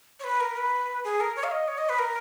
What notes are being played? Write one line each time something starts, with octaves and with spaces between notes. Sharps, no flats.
C#5
B4
A#4
B4
G#4
A#4
C#5
F5
D#5
C#5
D#5
B4
A#4